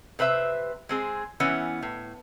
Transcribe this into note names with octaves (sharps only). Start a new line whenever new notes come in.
C3 B4 C5 E5
G#3 C4 G#4
E3 B3 C#4 E4
A2